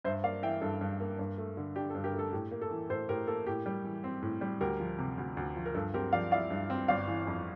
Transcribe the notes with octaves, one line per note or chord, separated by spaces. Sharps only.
G2 C5 E5
A#3 D5 F5
E3 E5 G5
G2 A4
G2
A#3
G2
A3
D3
D4 G4
A4
G2
G4 A#4
A3
A4
A2 G4
A#3
A4
E3
A2 A4 C5
A2 G4 A#4
A#3 A4
A2 G4
G3
E3
C4
A2
G3
D2 G4 A#4
F3
C3
D2
D2
F3
A#4
G2 A4
C4 G4 A#4
F3 D5 F5
E4 D5 F5
G2
C4
G1 D5 F5
E3
F2